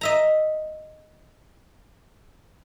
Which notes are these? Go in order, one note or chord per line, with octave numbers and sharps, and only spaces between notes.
D#5 E5 A#5